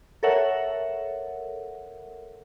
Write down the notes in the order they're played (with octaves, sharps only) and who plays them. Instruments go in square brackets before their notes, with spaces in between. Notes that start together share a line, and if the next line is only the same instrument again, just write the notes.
[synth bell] A4 A#4 C#5 E5 F#5